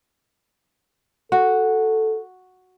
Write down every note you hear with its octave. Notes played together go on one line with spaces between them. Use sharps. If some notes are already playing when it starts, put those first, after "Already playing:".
F#4 A4